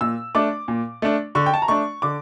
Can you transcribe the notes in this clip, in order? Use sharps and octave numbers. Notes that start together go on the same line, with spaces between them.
A#2 E6
A3 D4 D6
A#2
A3 D4
D3 C#6
G5
A5
A#5
A3 D4 C#6
D3 D6